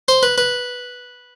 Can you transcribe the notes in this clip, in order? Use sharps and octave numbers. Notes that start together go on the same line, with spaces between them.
C5
B4
B4